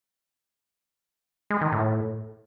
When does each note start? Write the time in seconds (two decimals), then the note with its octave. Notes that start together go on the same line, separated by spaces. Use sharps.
1.50 G#3
1.61 D#3
1.72 A2